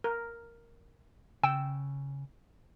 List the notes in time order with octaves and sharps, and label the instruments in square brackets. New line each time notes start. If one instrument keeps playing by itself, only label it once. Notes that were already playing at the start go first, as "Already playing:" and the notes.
[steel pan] A#4
[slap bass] C#3 [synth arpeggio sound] G5 [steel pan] E6